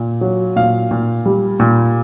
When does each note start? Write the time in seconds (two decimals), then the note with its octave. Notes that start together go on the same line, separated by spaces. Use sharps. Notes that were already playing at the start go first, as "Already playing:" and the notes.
Already playing: A#2
0.21 F#3
0.56 A#2 F5
0.91 A#2
1.26 G3
1.60 A#2